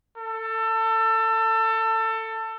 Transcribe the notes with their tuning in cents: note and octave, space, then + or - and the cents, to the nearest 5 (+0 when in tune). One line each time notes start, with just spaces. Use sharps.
A4 +25